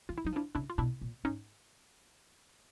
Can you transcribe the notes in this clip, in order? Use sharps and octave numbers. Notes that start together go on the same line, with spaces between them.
E3 F4
E4
F#3 D#4
F3
D4 E4
C#3 D4 E4
F4
B2 D4 E4
A#2
G#2 C#4 D#4